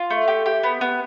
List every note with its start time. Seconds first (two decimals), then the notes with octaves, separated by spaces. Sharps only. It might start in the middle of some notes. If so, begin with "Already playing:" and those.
Already playing: F4
0.11 A3
0.28 G4
0.46 G4
0.63 B3
0.81 B3